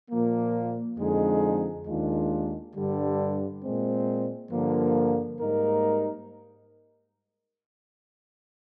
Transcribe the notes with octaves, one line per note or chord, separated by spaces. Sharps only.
A#2 F3 A#3
F2 D3 G#3 D#4 G#4
D#2 D#3 G#3 D4 F4
G2 D3 G3
A#2 G#3 C4
G2 D3 F3 A#3
G#2 G3 A#3 D#4 A#4